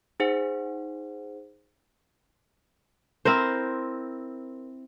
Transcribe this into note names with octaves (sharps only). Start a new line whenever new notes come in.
D#4 G#4 C5 F#5
C4 E4 A#4 C5